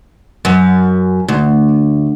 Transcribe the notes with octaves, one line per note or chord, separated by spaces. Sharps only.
F#2
D2